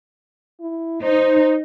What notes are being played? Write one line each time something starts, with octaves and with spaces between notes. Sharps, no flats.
E4
D#4 C5